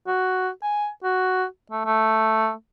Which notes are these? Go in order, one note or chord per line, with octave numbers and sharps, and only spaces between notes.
F#4
G#5
F#4
A3
A3